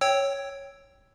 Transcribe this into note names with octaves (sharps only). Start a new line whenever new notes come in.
C#5 G5 E6